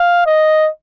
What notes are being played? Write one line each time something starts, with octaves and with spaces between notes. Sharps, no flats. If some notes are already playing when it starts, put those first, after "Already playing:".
Already playing: F5
D#5